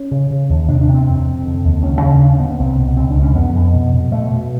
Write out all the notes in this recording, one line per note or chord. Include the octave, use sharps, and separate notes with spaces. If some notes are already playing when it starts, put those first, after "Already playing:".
Already playing: C#4
C#3
C#3
D#2
C3 D4
D4
C3
C4
F2 C4
F2
D3
D#2
C#2 C#4
C#3
D3 D4
C#4
D3 B3
B3
C2 C4
B2
C#2 C4
D4
C#2
C#4
F2 B3
F2
B2
B2
B2 A3
B2